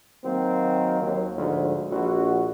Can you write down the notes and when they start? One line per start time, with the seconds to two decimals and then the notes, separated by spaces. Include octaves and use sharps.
0.24 D#3 F#3 A#3 C4
1.01 D#2 F#3
1.38 D2 G#2 F3
1.91 A#1 F#4